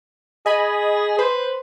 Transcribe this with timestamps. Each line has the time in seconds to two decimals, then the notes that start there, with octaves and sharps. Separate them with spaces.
0.46 G#4 D#5 G#5 B5
1.19 B4 C5